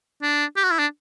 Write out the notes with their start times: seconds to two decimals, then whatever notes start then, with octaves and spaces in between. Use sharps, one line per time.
0.22 D4
0.56 G4
0.64 F#4
0.71 E4
0.79 D4